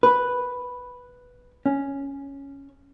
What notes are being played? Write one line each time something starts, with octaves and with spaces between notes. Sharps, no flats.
B4
C#4